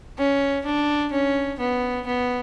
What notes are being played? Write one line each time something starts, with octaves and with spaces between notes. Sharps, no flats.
C#4
D4
C#4
B3
B3